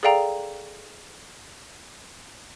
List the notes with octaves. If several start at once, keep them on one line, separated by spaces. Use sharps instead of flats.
G#4 A4 D5 F5 G5 A#5